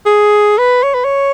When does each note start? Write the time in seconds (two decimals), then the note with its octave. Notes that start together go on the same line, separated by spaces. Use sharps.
0.06 G#4
0.58 B4
0.83 C#5
0.94 B4
1.04 C#5